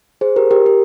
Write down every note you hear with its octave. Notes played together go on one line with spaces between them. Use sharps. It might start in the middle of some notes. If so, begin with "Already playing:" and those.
G#4 C5
G4 A#4
G4 A#4
G4